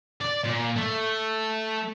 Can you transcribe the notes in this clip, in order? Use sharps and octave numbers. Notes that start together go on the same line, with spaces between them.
D5
A#2
A3